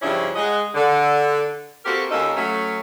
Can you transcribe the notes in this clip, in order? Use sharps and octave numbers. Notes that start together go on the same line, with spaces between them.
G2 C#3 F3 C#4 D4 E4
G#3 D#5 F#5
D3
A#3 C4 F#4 G4 A4 A#4
D#2 A#3 C#4 D#4 F4 A4
F#3 A3 C#4